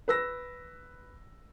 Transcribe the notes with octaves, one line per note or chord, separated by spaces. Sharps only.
B4 E6 A#6